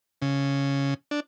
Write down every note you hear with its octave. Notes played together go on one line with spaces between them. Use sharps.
C#3
D4